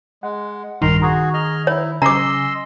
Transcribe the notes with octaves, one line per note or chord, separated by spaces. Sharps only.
G#3 F#5
A#1 G2 D#3 A#4 A#5 C6
F#4 G#4 A#5
G#4 D#5 F6
E4 C#5
C#3 D#5 G#5 A#5 C6 D6 E6